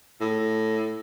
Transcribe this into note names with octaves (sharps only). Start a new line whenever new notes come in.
A2